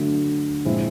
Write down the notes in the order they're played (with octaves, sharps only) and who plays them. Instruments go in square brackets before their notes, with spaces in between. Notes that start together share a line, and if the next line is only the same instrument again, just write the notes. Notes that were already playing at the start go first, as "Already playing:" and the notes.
Already playing: [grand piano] D3 F#3 A3 D4
A#2 F3 G#3 C4 E4